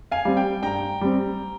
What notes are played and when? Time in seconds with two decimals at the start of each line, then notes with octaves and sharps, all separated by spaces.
0.11 F5 G#5
0.25 G3 C4
0.37 G5
0.62 G2 G5 A#5
1.01 G3 C4